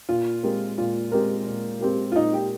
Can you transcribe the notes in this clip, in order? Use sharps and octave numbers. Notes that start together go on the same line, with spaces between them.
A#2 F4
G#3 C4 G4 A#4
A#2 F4
G#3 C4 G4 A#4
A#2
G#3 C4 G4 A#4
F4
A#2 D#4
G4